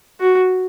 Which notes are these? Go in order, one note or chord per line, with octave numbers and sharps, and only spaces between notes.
F#4